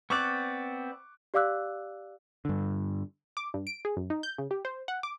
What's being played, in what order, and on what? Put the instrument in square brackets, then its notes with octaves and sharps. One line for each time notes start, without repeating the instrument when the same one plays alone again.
[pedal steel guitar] B3 C4 D5 [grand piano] C#6 D6 F#6
[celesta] G4 D5 F5 D6 E6 F#6
[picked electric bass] G2 D3
[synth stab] D6
G2
D7
G#4
F#2
D#4
G6
C#3
G4
C5
F#5
D6